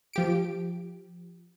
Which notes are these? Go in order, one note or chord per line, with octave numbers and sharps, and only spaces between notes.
F3 G4 D7